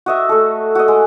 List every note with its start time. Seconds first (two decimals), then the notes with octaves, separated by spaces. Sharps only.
0.06 F#4 D#5 E5
0.29 A3 A4
0.75 F#4 D#5
0.88 G#3